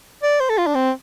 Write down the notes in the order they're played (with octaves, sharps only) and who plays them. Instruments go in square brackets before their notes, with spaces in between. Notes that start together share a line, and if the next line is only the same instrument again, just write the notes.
[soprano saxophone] D5
C5
A4
F4
D4
C4